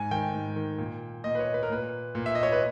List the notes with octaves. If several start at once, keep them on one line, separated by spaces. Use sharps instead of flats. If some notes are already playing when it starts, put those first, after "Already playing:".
Already playing: G#2 G#5
D#3 G5
G#2
D#3
A#2
A#2 D#5
B4
C#5
B4
A#4
A#2 B4
A#2
E5
D#5
C#5
B4